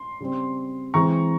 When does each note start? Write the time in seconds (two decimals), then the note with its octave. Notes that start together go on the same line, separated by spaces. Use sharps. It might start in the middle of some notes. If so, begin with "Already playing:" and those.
Already playing: C6
0.20 C#3 G3 C4
0.94 E3 G#3 C4 A#5 C#6